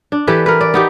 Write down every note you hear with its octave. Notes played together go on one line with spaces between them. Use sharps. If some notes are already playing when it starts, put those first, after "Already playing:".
D4
E3 G4 A4 B4
A#4 B4
D5
B3 D#4 G4